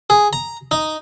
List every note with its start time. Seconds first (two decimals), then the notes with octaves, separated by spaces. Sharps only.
0.10 G#4
0.33 A#5
0.71 D#4